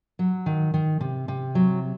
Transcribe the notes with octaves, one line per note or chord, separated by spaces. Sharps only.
F#3
D#3
D#3
C3
C3
F#3